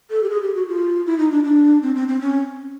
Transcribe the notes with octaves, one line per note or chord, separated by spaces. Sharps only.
A4
G4
G#4
G4
F#4
F4
E4
D#4
D4
D4
C4
C4
C4
C#4